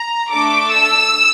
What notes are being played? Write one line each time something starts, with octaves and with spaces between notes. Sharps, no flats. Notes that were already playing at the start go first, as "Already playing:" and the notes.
Already playing: A#5
A3 D4 A4 D6
E6